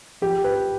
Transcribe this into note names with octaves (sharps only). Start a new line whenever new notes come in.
F3 G4
B4